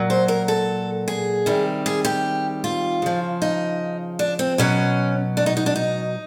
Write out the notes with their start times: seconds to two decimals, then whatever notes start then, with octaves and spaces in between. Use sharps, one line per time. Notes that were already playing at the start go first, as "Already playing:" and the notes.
Already playing: A#2 F#3
0.10 C5
0.28 A#4
0.48 A4
1.08 G#4
1.46 C3 D#3 G3
1.86 G#4
2.05 G4
2.64 F4
3.02 C#3 F3
3.42 D#4
4.19 D4
4.39 C4
4.58 B2 F#3 C#4
5.37 D4
5.46 D#4
5.57 D#4
5.66 D4
5.76 D#4